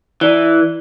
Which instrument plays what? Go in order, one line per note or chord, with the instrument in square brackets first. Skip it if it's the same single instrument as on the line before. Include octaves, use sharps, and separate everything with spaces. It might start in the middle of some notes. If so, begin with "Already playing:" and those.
[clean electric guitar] E3 [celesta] E4 D5 G7